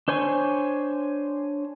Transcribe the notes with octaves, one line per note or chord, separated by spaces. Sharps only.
D4 C5 C#5 G#5 C#6